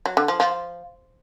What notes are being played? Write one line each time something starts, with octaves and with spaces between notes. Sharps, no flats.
F#3
D3
F3
F3